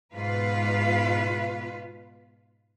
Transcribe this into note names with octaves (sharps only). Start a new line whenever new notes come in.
G#2 B2 F4 B4 F5